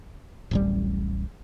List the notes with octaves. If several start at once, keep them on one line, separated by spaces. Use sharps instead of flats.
D1 A1 G3